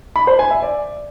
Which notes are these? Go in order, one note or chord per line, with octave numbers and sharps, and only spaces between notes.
B5
C5
G#5
E5
D5